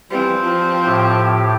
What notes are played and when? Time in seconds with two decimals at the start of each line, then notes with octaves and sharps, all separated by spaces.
0.10 E3 F3 G3 C4
0.43 F3
0.86 A2 G4